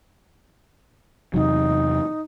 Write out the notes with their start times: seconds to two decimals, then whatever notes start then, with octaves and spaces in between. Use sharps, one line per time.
1.34 E2 C3 F#3 D#4